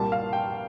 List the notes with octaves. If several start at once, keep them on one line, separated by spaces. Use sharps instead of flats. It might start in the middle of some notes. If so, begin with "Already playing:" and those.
Already playing: C2 A#2 G3 A5
F5
G5